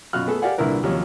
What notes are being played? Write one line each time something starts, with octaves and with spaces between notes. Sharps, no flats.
F#2 B2 F4 F#4 F6 F#6
A3 B3 G#4 A4
G4 A#4 D5 F5 F#5 G#5
C2 A#2 D3 E4 A#4 B4
D#2 C3 F3 F#3 C#4